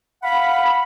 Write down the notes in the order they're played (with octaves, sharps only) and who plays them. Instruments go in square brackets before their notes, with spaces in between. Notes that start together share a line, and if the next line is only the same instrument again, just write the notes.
[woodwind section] F5 F#5 B5